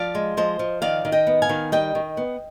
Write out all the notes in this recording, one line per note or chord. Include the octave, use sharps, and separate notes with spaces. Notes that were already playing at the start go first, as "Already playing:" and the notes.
Already playing: F3 D5 F5
G#3
F3 C5 D#5
F3
D#3 D5 F5
D#3
D#5 G5
B3
F5 G#5
D#3
G3 D#5 G5
D#3
B3